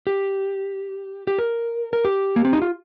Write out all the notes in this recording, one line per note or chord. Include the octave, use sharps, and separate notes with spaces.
G4
G4
A#4
A#4
G4
A#3
C4
D#4
F4